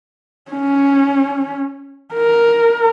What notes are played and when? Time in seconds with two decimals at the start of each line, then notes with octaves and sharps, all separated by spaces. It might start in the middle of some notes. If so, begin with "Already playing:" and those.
0.52 C#4
2.14 A#4